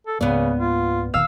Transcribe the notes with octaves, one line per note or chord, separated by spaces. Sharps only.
A4
C#2 G#2 C#3 A#3 B3 D5
F4
F1 A#2 D#3 F5 E6